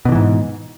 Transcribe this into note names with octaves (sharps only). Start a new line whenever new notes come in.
G#2 B2 D3 E3